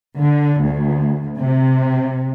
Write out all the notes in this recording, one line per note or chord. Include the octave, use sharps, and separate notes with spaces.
D3
D2
C3